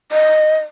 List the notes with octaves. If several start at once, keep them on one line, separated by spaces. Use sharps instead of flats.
D#5